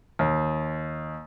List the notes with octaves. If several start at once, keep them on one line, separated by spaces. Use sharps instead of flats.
D#2